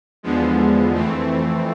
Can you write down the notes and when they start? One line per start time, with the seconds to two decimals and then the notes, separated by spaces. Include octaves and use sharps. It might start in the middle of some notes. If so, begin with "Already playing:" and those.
0.23 E2 D3 F3 G#3 B3
0.94 F2 E3 A3 C4